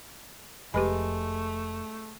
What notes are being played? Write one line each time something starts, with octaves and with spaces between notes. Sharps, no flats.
F1 G#3 A3 G4 B4 B5